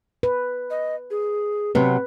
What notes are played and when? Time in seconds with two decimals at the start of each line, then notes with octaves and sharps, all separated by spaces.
0.23 B4
0.71 D#5
1.11 G#4
1.75 C3 F#3 B3 B4